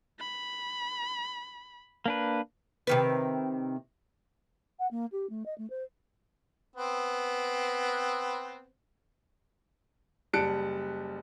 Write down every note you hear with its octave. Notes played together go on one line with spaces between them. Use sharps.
B5
A#3 D4 B4
C3 D#3 B4
F#5
A#3
G4
A3
D#5
A3
C5
B3 C4
F#1 G3 A5 F#6 C#7 D7